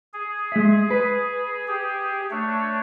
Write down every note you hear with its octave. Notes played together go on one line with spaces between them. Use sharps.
G#4
G#3 E5
B4
G4 G#4
A3 D4 C#5